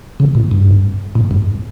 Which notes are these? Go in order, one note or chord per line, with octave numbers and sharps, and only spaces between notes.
C#3
A2
G2
A2
G2